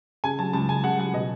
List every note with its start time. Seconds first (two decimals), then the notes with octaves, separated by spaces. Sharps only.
0.24 C#3 G#5
0.39 F#3 A5
0.53 C#2 A5
0.69 C#2 G#5
0.84 C#3 F#5
0.98 F#3 F#5
1.14 B2 D#5